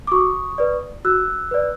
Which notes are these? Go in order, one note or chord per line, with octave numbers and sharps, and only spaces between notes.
D6
F#4 C#6 D#6
B4 D5
F#4 E6 F#6
B4 D5